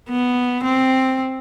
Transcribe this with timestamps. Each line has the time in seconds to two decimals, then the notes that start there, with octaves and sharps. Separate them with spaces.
0.09 B3
0.64 C4